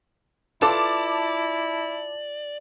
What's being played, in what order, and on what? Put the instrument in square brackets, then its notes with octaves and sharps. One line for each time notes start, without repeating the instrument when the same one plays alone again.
[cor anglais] E4 [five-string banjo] F4 A4 B4 [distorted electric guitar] D5 [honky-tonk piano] A5 D6